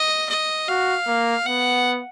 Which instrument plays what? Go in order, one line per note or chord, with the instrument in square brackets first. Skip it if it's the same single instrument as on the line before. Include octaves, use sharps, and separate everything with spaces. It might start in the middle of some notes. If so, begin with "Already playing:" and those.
Already playing: [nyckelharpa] D#5
D#5
[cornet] F#4 [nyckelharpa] F5
[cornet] A#3
[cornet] B3 [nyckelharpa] F#5